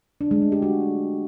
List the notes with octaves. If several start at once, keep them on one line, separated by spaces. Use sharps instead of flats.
D4
G#3
A3
G4
F#4